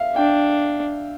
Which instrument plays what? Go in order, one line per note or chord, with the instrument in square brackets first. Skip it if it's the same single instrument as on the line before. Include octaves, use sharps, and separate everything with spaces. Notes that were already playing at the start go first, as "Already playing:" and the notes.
Already playing: [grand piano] E5 F5
[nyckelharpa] D4 [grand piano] G5